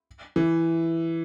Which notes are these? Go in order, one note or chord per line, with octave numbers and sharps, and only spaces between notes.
E3